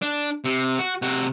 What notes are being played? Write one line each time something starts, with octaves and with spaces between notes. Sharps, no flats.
D4
C3
F#4
C3 F#4